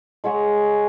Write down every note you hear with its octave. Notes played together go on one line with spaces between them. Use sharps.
G#3 C#5 F#5 C#6